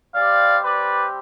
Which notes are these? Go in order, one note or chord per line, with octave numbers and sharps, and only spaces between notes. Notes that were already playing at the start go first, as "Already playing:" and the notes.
G3 C4 G4 D5 F5
B4 D5